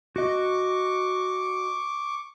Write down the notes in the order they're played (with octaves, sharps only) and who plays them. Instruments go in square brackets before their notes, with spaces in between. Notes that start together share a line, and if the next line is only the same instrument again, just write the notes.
[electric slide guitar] F#4 D#5 [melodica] C#6 D6